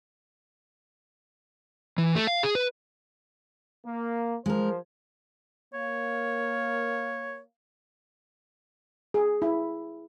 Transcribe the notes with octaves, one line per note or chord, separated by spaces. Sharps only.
E3
A3
F5
G#4
B4
A#3
F3 G#3 A#4 C5
A#3 A#4 C#5 F5
G#4
E4